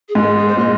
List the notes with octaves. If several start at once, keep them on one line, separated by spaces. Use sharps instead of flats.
G#4
G#2 F4
A#4
G#4
G#4
C5
A#2 D#5